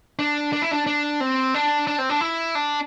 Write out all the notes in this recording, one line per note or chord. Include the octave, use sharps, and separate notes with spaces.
D4
D4
E4
D4
D4
C4
D4
D4
C4
D4
E4
D4